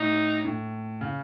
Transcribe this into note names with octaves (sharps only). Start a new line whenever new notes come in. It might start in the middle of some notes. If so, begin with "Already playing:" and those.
Already playing: A2 D#4
A2
C#3